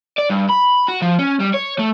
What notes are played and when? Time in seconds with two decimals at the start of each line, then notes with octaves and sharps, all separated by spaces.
0.18 D5
0.30 G2
0.50 B5
0.88 F#4
1.02 F3
1.19 C#4
1.40 G3
1.54 C#5
1.79 A3